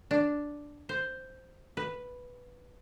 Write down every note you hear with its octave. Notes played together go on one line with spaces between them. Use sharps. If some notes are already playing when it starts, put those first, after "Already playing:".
D4
C5
B4